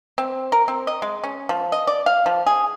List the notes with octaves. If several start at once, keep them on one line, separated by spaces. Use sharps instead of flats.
C4
A#4
C4
D#5
G#3
C#4
F3
D#5
D5
F5
F3
G#4